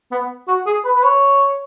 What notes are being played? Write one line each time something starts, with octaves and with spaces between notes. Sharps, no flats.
B3
F#4
G#4
B4
B4
C#5